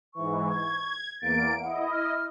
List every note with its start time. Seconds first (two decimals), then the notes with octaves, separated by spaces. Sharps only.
0.14 G#2 E3 C#6
0.49 G#6
1.21 E2 A#3 A6 D7
1.61 E4 D#5 F#5
1.91 F6